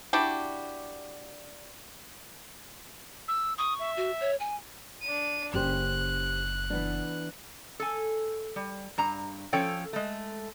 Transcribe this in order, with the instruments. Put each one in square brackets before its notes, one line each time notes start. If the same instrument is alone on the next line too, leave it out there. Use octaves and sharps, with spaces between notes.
[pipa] D4 E4 F#4 G4
[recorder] E6
[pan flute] C#6 [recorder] D#6
[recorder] E5
[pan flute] F#4
C#5
G#5
[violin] D4 D#7
[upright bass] F#1 [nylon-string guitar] C#4 G4 C5 [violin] F#6
[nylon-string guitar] E3 B3 D4
[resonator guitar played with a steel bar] A4 G#5
G3
G2 A#5
F3 C#4 A4 C#5 G5
G#3 A3